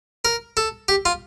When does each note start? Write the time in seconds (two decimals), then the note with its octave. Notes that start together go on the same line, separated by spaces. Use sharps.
0.25 A#4
0.57 A4
0.88 G4
1.05 F4